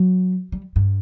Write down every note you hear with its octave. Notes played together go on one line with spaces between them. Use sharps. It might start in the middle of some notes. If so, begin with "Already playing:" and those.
Already playing: F#3
G3
G2